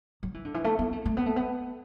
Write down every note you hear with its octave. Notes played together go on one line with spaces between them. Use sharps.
F#3
E3
D3
E3
A3
B3
A3
A3
B3
A3
B3